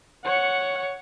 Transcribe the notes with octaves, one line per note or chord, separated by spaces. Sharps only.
C#5 F#5